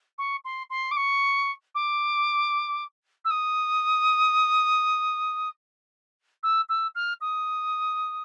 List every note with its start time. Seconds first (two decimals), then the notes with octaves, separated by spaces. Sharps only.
0.18 C#6
0.45 C6
0.70 C6
0.91 D6
0.97 C#6
1.75 D6
3.25 E6
3.31 D#6
6.43 E6
6.69 E6
6.95 F6
7.21 D#6